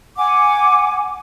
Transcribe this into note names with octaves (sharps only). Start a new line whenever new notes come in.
F#5 G#5 D6